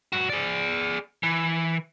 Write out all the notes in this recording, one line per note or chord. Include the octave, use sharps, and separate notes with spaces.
G2 F#4
G#4 D5
E3